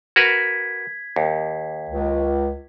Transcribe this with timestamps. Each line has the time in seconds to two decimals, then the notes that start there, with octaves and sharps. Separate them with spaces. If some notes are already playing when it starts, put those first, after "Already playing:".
0.16 F#4 A#4 B4 G#6 B6
1.16 D#2
1.88 C#2